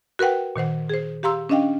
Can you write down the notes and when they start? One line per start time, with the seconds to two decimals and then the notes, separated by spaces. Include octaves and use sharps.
0.19 F#4 A#4 B4 F#5 G5
0.56 A#2 D#3 C5 F#5
0.89 G#4 C5
1.23 G4 F5 A#5 C6 E6
1.49 C#4 D4 D#5 F5 G5